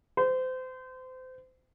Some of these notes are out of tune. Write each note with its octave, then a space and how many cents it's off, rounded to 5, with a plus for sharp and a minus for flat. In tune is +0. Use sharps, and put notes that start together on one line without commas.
C5 -30